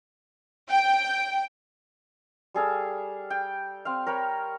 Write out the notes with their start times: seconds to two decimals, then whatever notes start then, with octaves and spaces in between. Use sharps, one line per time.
0.69 G5
2.54 G3 G#4 A4 F5
3.30 G5
3.85 C4 F5
4.06 A#4 C#5 G5 B5